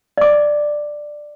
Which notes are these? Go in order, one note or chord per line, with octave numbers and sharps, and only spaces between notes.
D5 D6